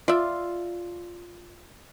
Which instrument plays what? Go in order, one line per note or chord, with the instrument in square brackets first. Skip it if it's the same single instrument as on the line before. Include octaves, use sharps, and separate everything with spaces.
[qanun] F4 [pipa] D5 E5